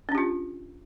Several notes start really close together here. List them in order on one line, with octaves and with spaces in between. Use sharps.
C#4 D4 G4 F4